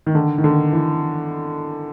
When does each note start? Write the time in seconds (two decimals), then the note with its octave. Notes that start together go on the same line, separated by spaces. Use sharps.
0.07 D#3
0.15 D3
0.38 D#3
0.44 D3
0.73 E3